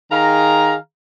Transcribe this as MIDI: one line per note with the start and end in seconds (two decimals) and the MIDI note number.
0.11 0.75 51
0.11 0.75 68
0.11 0.75 77
0.11 0.75 82